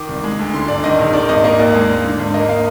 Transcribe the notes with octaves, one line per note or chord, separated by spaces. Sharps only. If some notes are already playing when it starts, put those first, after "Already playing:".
Already playing: D#3 D6
C2
G#3
D2
D3 C6
G1 D5
D#3 D#5
A#1
D#3 D5
G#1 D#5
A#3 D#5
D#2 D5
G#3
G#2
D3
G#1
A#3 D#5
F5